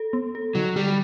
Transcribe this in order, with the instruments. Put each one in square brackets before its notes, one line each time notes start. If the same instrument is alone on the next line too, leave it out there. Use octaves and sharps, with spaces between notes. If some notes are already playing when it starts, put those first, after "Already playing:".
Already playing: [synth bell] A4
B3
A4
[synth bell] D3 [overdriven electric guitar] F#3
[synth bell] F#3 [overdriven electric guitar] G3